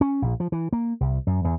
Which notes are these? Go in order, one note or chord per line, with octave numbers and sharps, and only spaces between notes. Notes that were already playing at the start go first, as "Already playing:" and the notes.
C#4
A#1
F3
E3
A#3
C2
F#2
E2